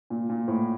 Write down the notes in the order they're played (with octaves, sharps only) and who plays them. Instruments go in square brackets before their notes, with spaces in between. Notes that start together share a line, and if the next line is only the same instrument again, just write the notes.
[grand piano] A#2
A#2
A2